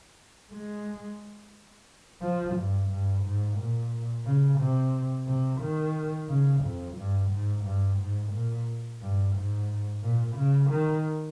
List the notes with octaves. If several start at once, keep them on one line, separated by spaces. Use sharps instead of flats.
G#3
F3
G2
G2
G#2
A#2
C#3
C3
C3
D#3
C#3
F2
G2
G#2
G2
G#2
A#2
G2
G#2
A#2
C#3
D#3